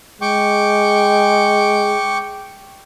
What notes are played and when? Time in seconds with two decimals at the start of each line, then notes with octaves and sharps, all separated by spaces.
0.22 G#3 G5 C#6 D6